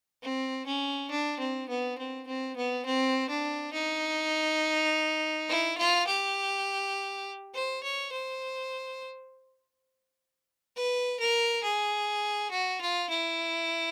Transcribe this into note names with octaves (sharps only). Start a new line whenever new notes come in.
C4
C#4
D4
C4
B3
C4
C4
B3
C4
D4
D#4
E4
F4
G4
C5
C#5
C5
B4
A#4
G#4
F#4
F4
E4